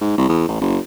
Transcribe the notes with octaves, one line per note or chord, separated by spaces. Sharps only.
G#2
C2
E2
A1
F#1